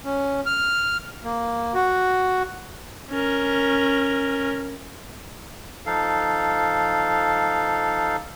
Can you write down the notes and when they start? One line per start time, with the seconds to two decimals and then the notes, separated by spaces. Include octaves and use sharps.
0.05 C#4
0.46 F6
1.24 A#3
1.74 F#4
3.10 C#4 A#4
5.86 F3 D#4 A4 F5